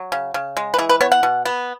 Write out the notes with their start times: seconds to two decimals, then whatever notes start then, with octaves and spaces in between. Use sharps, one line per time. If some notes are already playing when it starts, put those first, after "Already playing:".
Already playing: F#3
0.12 C#3
0.34 C#3
0.57 G#3
0.74 B4
0.78 E3 G#4
0.89 B4
1.01 B3 C#5
1.12 F#5
1.23 B2
1.45 B3